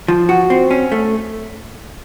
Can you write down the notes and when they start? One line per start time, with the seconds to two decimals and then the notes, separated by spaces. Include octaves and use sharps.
0.08 F3
0.29 F#4
0.50 C4
0.71 C#4
0.92 A3